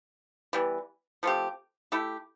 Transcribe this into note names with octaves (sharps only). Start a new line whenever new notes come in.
E3 G3 B3
F3 A3 C4 G4
A3 E4 G4